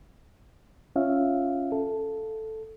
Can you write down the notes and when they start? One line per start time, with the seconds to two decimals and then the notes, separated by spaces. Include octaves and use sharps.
0.96 C#4 F4 E5 F5
1.72 A4